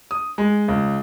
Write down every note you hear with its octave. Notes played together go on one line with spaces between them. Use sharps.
D#6
G#3
C#2